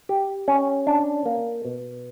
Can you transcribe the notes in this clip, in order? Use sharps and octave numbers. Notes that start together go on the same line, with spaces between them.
G4
C#4
D4
A#3
B2